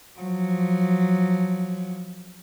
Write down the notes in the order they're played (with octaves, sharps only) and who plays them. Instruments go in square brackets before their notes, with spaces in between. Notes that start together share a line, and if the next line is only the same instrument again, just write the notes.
[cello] F3 F#3